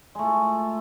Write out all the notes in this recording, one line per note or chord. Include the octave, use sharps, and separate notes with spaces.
G#3 A3 F4